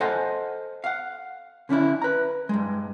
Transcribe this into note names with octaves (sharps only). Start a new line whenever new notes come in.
A4 C5 D#5 F#5 G#5
F5 F#5
D3 C#4 D4 E4
B4 A#5
G2 G#3